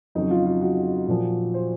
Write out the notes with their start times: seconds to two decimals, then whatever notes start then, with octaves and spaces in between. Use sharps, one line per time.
0.15 F2 C#3 F#3 D#4
0.31 F4
0.46 F4
0.61 F#4
1.08 A#2 F3
1.54 C5